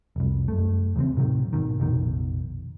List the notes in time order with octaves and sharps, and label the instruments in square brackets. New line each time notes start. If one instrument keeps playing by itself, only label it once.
[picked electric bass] F1 C2
F#2 A3
E2 C#3 A3 C4
A2 C3 D#3 F#3
G#1 B2 D#3
F1 A#1 B2 D#3